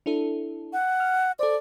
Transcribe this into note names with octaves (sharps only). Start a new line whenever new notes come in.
D4 E4 A4
F#5
F6
A4 C5 D5